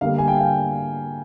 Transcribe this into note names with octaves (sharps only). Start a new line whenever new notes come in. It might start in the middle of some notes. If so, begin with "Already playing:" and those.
D3 G3 A#3 F5
G#5
G5
F5